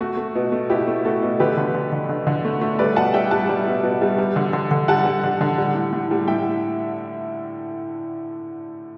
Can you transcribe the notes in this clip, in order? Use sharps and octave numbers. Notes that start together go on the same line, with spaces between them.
A3 F#4
A3
B2
A3
B2 E4 G4
A3
A3 F#4 A4
B2
D3 G4 B4
D3
D3
D3
D3
D3
A3
A3
G3 B4 D5
B2 F#5 A5
G3 E5 G5
G3 F#5 A5
G3
B2
B2
G3
G3
D3
D3
D3
G3 F#5 A5
G3
D3
D3
G3
A2
A2
G3
A2 E5 G5